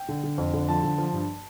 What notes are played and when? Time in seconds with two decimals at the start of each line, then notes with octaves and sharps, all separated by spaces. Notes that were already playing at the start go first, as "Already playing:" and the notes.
Already playing: G5
0.09 D3
0.23 D3
0.38 F2
0.53 D3
0.68 F3 A5
0.83 D3
0.98 F3
1.13 G2